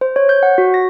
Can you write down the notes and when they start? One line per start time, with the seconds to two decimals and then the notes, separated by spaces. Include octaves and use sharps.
0.01 C5
0.16 C#5
0.29 G6
0.43 F#5
0.58 F#4
0.74 A#6